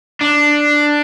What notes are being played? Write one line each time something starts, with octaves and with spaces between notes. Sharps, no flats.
D4